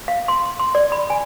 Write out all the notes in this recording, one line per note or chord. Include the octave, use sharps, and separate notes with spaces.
F5
C6
C6
D5
B5
G#5